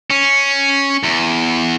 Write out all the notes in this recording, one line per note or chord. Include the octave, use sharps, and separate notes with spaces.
C#4
E2